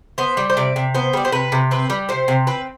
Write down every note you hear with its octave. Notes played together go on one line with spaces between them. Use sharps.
B3 C5
G3
C5
C3 D5
C3
B3 C5
G3 D5
C5
C3 B4
C3
C4 B4
G3
C3 C5
C3
C4 B4